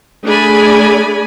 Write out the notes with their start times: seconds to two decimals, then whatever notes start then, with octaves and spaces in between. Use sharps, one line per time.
0.24 A3 D4 G#4 D5 G#5 B5